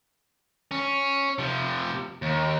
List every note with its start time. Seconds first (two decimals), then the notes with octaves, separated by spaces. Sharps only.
0.71 C#4
1.39 C3 F3
2.22 D#2